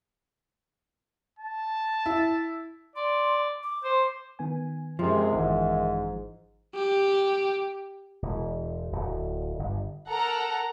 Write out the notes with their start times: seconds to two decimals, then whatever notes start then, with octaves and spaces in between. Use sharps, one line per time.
1.39 A5
2.06 E4
2.96 D5 C6
3.63 D6
3.84 C5
4.39 D#3 B3 G#5
4.99 F#2 C3 F3 G#3
5.33 G#1 G#2 D#3 E3
6.75 G4
8.22 E1
8.92 D1
9.59 G1
10.08 A4 A#4 F#5 A#5